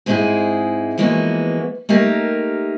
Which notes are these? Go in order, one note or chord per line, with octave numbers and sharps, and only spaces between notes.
G#2 G#3 C4 D#4 E4 G#4
E3 F3 G#3 A#3 B3 F#4
A3 A#3 D#4 G4 A#4